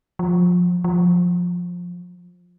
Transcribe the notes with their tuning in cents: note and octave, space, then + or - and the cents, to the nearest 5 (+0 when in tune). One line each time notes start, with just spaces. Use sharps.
F3 +25
F3 +15